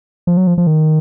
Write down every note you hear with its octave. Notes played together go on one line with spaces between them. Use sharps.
F3
F#3
F3
F3
D#3